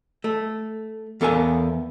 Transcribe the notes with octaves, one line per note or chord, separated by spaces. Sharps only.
A3
E2 B3 A4 A#4 F5 G#5